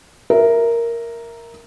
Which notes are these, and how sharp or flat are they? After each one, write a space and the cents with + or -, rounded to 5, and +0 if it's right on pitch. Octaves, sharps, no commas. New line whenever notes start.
A#4 +0 E5 +0